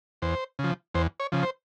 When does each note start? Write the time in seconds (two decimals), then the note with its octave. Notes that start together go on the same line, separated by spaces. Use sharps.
0.22 E2 C5
0.59 C#3 F3
0.94 E2 C5
1.20 C#5
1.32 C#3 F3
1.43 C5